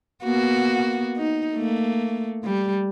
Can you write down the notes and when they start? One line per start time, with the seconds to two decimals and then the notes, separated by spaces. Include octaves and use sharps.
0.24 A#3 B3 F#4
1.16 D#4
1.54 A3 A#3
2.44 G3